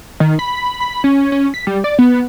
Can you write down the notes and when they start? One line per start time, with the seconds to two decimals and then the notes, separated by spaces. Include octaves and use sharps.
0.20 D#3
0.39 B5
0.80 B5
1.04 C#4
1.32 C#4
1.54 B6
1.67 G3
1.84 D5
1.99 B3